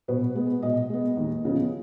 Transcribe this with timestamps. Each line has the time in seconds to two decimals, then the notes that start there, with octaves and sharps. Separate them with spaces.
0.08 B2 B4
0.35 G#3 B3
0.62 B2 D#5
0.90 G#3 B3
1.17 D#2
1.45 C#3 F3 B3